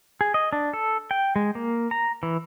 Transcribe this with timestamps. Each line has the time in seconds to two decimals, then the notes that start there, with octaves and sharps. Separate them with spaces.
0.21 G#4
0.34 D#5
0.53 D4
0.73 A4
1.11 G5
1.36 G#3
1.55 A#3
1.91 A#5
2.23 E3